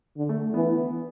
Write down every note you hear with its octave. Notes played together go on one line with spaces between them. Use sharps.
D3
A3
E3 B3